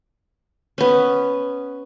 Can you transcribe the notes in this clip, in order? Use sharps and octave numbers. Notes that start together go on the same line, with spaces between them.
B3 C#4